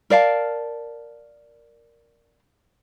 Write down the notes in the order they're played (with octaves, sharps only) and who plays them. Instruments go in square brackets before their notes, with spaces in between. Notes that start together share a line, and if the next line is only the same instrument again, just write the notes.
[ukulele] A#4 D5 F5 A5